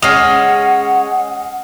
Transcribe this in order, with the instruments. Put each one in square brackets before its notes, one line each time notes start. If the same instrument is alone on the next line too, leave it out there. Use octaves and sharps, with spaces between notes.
[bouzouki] G#3 C#4 [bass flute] F#5 [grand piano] D#6 F6 C7